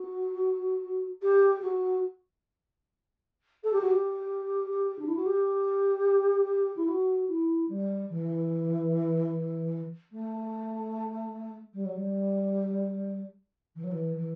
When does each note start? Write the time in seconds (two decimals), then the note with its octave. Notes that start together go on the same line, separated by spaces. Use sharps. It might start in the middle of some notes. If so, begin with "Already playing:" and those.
Already playing: F#4
1.22 G4
1.61 F#4
3.63 A4
3.72 G4
3.81 F#4
3.90 G4
4.98 D4
5.07 E4
5.16 F#4
5.25 G4
6.76 E4
6.87 F#4
7.28 E4
7.68 G3
8.09 E3
10.11 A3
11.73 G3
11.85 F#3
11.95 G3
13.75 E3
13.83 F#3
13.91 E3
14.16 E3